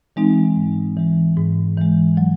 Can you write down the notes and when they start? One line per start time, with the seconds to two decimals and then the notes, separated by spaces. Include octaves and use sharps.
0.16 E3 G#3 C4 D#4
0.56 G#2
0.97 E3 G#3
1.37 G#2
1.77 E3 G#3
2.17 F#3